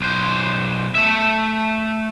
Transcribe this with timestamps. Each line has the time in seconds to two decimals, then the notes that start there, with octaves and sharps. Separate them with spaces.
0.01 B1 C5
0.95 A3 E5